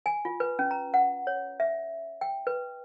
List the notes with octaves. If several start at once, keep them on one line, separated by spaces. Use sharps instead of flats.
G#5
F4
B4
C#4
A#5
F#5
C#5
E5
G5
B4